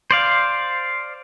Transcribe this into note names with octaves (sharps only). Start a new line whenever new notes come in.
C5 D5 F5